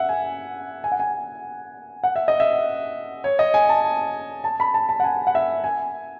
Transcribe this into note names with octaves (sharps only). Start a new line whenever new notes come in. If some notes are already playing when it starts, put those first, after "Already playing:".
Already playing: E5 F#5
G#5
G#5
F#5
G#5
F#5
E5
D#5
E5
C#5
D#5
G#5
A5
A5
B5
A5
A5
F#5
G#5
F#5
E5
G#5